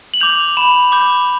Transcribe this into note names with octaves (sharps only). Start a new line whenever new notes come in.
F#7
D6 G6 F7
B5 E7
D6 G6